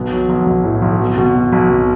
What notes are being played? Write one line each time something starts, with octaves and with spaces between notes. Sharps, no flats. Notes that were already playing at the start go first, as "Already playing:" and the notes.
Already playing: B1 B3
F#3
B1
B1
A2
B1
B2
B2
B2
B1
B2